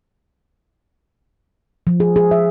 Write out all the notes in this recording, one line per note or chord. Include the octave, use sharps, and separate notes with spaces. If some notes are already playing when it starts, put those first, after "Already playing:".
F3
G#4
G#4
E5